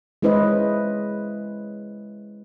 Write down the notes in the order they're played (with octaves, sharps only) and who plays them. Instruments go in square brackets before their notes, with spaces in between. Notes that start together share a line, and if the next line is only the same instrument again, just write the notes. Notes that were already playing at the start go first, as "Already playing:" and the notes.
[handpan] G#3 C#4 E4 B4 C5 D#5